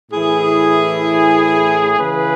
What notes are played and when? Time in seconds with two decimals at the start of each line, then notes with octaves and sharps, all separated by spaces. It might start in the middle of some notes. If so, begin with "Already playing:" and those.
0.11 A2 E3 E4 G#4
1.98 C#3 E3 G#4 B4